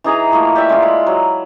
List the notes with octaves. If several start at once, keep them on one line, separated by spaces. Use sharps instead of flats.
E3 D#4 G#4 A#5
E3 F3 A3 A#3
G4 D5 E5
G#3 E4 F4 C5
B5
F#3